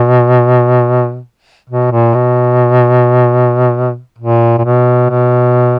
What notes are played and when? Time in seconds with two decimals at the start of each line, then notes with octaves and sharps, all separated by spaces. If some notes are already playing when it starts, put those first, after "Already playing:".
Already playing: B2
1.70 B2
1.92 A#2
2.14 B2
4.19 A#2
4.58 A#2
4.64 B2
5.10 B2